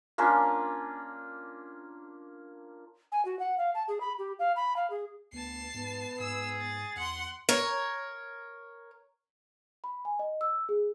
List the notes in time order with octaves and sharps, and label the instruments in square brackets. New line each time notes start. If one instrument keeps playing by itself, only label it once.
[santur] A#3 C#4 D4 F4
[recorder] G#5
F#4
F#5
F5
A5
G#4
B5
G4
F5
B5
F5
G#4
[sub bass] D2 [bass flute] B3 [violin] A5 C7
[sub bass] G#2 [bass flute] B3
[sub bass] G#2 [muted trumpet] G#4 [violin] E6
[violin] A6
[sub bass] E2 [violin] F#5 C6
[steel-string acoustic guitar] A#4 C#5
[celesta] B5
G#5
D#5
E6
G#4